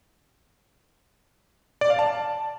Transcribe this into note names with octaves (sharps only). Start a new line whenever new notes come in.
D5
F5
A5